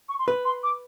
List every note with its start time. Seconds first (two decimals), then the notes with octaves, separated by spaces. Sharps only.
0.09 C#6
0.19 C6
0.28 B4
0.45 C6
0.63 D6